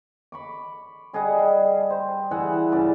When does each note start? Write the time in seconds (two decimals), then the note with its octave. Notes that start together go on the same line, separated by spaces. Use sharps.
0.32 B5 C#6 D6
1.13 G3 G#4 D#5 F#5
1.39 G3
1.90 C5
2.31 E3 G#4 E5 F#5
2.72 G2 C#3 D5 A5